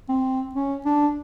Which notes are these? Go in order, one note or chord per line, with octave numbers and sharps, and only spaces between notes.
C4
C#4
D4